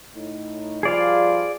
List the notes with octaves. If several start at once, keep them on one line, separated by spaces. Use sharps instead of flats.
A2 D#4
F3 G3 F4 G#4 D5 F5